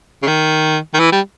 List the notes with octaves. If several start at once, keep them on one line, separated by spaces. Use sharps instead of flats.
C#3
D#3
D#3
E3
G3